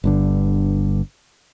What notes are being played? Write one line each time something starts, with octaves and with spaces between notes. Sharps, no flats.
G1 G2 D3